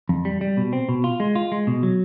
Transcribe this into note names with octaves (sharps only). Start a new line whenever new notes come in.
F2
G3
G3
B2
C4
B2
F4
G#3
F4
G#3
B2
F#3